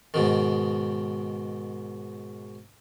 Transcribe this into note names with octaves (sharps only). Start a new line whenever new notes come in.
G#2 B2 D#3